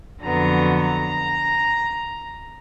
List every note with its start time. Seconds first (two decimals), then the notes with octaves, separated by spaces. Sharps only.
0.22 F2 D3 F#3 B3 A#5
0.76 A#5